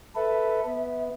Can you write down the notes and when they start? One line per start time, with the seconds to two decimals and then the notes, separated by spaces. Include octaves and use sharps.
0.15 A4 B4 E5
0.65 B3